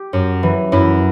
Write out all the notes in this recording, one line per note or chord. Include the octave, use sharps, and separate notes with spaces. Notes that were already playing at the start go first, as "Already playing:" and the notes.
Already playing: G4
F#2
E3
F#2 E4